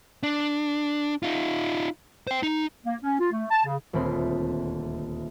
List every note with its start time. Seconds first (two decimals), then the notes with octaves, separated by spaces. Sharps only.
0.23 D4
1.23 D#4 F4
2.27 C5 G5
2.43 D#4
2.86 A#3
3.03 C#4
3.20 F4
3.32 A3
3.51 A5
3.65 C#3
3.93 D#1 D2 C4 B5 C6